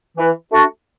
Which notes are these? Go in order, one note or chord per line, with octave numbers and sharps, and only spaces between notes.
E3
A3 D4 F#4